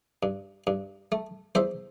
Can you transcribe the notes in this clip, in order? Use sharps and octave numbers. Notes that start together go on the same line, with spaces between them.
G2
G2
A3
E2 C5 E5